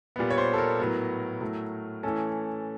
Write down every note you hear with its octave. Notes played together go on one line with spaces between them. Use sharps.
A#2 G3 B3
C#5
C5
A4
A#4
A2 F#3 B3
A2 F#3 A3
E3 A3 C#4 A4